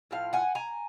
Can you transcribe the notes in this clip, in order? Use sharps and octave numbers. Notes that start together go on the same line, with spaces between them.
A2 F3 F5
F#5 G#5
G#5 A#5